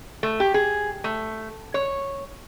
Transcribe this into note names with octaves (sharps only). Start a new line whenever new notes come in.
A3
G4
G#4
A3
C#5